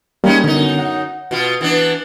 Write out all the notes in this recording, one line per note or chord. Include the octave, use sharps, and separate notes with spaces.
G3 G#3 A#3 C#4 D#4
F#2 D3 B3 D#4 A#4
F#5
B2 F4
E3 B3 D4